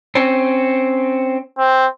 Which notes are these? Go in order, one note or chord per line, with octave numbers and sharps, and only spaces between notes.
C4 C#4
C4